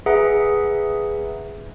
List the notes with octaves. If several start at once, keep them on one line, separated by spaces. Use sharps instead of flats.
G#4 B4 E5 F#5 A#5